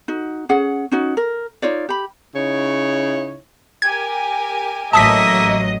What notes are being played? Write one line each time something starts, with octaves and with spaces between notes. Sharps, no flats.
D#4 F#4
C#4 G#4 F#5
C#4 D#4 F#4
A#4
D#4 F4 C#5 D5
G4 B5
C#3 D#4 E4 C#5
G4 A#4 G#5 G#6
A1 F#3 A#3 D#5 E5 A5 D#6 B6